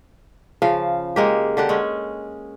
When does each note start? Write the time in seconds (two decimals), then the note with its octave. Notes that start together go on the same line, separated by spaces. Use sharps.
0.62 C#3 F3 F5
1.16 G#3 A#3 G4
1.57 D3 G4 F#5
1.69 G#3 C#4